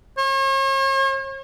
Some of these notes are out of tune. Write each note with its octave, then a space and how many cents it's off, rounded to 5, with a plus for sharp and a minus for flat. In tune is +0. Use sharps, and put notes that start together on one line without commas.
C#5 -45